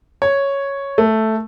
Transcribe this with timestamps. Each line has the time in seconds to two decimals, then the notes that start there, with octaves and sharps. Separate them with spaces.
0.22 C#5
0.98 A3